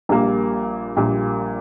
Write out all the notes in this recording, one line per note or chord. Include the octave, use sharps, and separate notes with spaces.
A#1 A#2 G3 A#3
A#1 A#2 G3 A#3